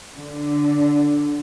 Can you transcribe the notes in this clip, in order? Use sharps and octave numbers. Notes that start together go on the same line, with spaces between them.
D3